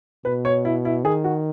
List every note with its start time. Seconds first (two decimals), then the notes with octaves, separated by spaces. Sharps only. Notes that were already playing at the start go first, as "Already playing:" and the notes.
0.25 B2 B4
0.45 C#5
0.65 E4
0.85 E4
1.05 D#3 G#4
1.24 F#4